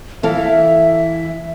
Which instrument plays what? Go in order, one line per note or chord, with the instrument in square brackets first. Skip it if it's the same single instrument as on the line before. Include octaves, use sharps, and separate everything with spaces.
[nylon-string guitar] E3 A4 F5 [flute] E5